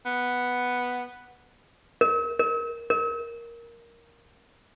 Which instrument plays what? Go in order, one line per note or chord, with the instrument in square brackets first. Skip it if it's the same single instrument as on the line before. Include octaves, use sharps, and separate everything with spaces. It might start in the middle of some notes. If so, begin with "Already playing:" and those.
[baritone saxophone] B3
[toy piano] A#4
A#4
A#4